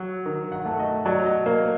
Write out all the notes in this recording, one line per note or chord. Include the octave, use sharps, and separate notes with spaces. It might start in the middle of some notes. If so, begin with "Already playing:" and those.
Already playing: F#3
D#3
F#5
A3
D#5
F#3 D5
D#5
A#3 D#5